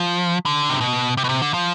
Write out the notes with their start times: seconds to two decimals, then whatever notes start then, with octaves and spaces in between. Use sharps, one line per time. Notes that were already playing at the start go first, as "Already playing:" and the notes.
Already playing: F3
0.46 D3
0.70 C3
0.81 B2
1.17 C3
1.24 B2
1.29 C3
1.42 D3
1.54 F3